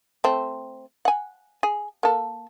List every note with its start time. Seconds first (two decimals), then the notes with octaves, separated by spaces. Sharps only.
0.24 A3 C4
1.05 F#5 G#5
1.63 G#4
2.03 A#3 A4